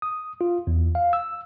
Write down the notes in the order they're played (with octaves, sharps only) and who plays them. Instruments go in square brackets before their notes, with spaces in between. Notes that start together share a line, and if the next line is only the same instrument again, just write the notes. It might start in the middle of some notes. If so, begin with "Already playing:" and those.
[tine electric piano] D#6
F4
E2
F5
E6